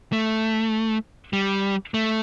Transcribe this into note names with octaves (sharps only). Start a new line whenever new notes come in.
A3
G3
A3